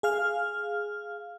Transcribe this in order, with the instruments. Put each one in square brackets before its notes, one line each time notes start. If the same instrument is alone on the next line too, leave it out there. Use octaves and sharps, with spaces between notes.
[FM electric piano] G#4 F5 F6